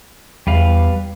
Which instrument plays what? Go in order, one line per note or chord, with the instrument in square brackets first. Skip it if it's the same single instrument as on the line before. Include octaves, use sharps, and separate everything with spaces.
[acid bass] E2 [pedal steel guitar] G3 B4 F5